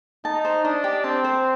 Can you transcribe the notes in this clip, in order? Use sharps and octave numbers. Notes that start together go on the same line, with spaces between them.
D#4 A5
C5
D4 D#5
G4
C4 A5
C5